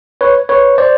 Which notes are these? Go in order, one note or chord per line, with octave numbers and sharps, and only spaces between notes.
B4 C#5
B4 C#5
C5 D5